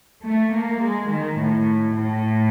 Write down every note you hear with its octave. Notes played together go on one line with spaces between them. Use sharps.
A3
A#3
G#3
D#3
A2
A2